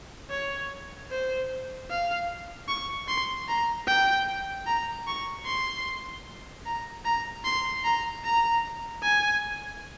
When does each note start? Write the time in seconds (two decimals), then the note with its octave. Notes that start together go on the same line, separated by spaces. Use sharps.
0.30 C#5
1.11 C5
1.90 F5
2.68 C#6
3.08 C6
3.48 A#5
3.87 G5
4.67 A#5
5.07 C#6
5.46 C6
6.66 A#5
7.05 A#5
7.44 C6
7.84 A#5
8.24 A#5
9.03 G#5